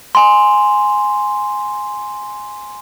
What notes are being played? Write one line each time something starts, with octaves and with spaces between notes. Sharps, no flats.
G#5 C6